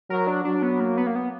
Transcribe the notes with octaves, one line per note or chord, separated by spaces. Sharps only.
F#3 A#4
D4
F#3 D4
B3
A#3
B3
A#3
B3